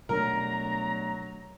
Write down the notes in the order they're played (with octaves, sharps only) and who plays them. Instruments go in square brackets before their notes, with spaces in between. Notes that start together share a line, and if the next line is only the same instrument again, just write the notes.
[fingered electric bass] B2 A3 D4 [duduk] F#3 [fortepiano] A#4 [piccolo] A#5